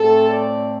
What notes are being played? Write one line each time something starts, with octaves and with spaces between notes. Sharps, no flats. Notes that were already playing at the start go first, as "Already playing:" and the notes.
Already playing: A2 A3 C4 A4
D5